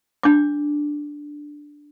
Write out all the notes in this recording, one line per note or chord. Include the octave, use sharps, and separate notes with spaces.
D4 D6